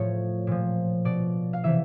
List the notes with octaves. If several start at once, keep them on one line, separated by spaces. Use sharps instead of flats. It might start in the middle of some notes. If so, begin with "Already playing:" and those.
Already playing: A2 F3 C#5
A#2 F3
B2 D5
F5
C3 E3 E5